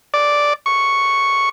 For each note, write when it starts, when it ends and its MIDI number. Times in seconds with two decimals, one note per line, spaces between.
0.14 0.53 74
0.66 1.49 85